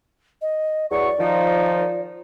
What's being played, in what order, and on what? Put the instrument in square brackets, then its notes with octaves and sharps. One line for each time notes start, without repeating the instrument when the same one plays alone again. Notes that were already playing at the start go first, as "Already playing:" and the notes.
[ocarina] D#5
[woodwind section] E2 F#3 C#6 [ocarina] D5
[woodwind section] D#3 F3 D#4